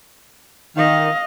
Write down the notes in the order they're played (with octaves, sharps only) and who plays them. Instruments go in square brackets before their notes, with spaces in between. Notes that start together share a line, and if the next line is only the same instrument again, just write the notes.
[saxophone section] D#3 [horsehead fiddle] D#5 F5